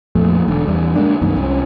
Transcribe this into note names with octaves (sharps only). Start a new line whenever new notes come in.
F2 A#2 A3
E1 D3
E2 G3
D3 G#3 A#3 D4
C2 F#2 D#3
C2 C#4